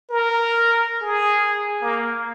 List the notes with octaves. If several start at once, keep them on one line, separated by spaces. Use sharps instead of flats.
A#4
G#4
A#3